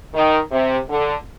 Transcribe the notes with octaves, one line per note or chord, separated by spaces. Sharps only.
D#3
C3
D3